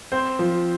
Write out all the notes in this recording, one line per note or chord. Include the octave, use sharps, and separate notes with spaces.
C4 C5
F3